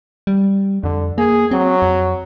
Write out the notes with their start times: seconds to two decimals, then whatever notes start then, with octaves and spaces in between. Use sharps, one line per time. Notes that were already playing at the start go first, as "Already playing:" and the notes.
0.27 G3
0.84 F2 D3
1.18 A#3 G#4
1.51 F#3 C4
1.82 F2